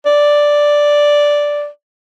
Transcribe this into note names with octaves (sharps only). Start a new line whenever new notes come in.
D5